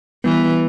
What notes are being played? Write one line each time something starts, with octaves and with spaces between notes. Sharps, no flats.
E3 G3 B3